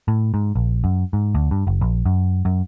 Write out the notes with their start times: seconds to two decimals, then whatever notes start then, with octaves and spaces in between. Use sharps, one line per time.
0.08 A2
0.34 G#2
0.55 A#1
0.84 F#2
1.13 G#2
1.34 D2
1.51 G2
1.67 F#1
1.81 A#1
2.06 F#2
2.45 F#2